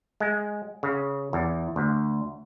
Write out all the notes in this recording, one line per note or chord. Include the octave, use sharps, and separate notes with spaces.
G#3
C#3
E2
D2